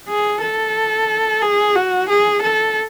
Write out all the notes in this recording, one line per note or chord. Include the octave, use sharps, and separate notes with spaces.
G#4
A4
G#4
F#4
G#4
A4